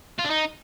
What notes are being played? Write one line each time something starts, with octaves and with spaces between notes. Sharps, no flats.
F4
D4
D#4